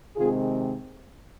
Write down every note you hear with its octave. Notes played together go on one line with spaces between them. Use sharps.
C3 D#3 G#3 C4 F4 G#4